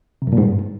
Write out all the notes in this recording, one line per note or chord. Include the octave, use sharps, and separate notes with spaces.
C3
F#2
A#2
G#2
G2